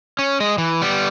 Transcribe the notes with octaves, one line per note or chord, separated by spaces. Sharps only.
C#4
G#3 D#5
E3
G3 B3